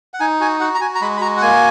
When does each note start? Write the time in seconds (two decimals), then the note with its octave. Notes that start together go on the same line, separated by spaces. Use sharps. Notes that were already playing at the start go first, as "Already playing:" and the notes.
0.14 F#5
0.20 D#4 G#5
0.40 F#4 G#5
0.60 F#4 F#5
0.74 A#5
0.81 F#4 G#5
0.95 A#5
1.01 G#3 B5
1.17 B5
1.21 F#4 A#5
1.37 F#5
1.42 A#3 G#5